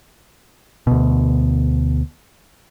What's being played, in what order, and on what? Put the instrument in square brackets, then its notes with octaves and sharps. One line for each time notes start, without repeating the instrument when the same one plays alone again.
[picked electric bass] D2 B2